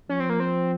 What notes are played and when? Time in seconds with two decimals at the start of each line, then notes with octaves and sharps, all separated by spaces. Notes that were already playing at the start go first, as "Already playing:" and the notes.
0.09 F3 C#4
0.20 C4
0.30 A#3
0.40 C4